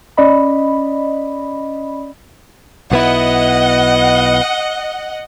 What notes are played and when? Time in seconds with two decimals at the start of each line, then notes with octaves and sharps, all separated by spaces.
0.17 C#4 D5 D#5 B5
2.92 B1 B3 E4 D#5 F#5